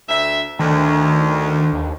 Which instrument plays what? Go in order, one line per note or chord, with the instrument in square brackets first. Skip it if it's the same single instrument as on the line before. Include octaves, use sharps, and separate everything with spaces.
[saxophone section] D2 E5
[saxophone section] D2 [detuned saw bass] D#3
[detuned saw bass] D#2